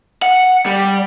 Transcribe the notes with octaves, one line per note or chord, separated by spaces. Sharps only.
F#5
G3